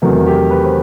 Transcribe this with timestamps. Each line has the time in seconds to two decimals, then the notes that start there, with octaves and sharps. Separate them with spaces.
0.02 E2 C3 D#3 F#3 A3 F#4
0.26 G4
0.51 B4
0.65 C5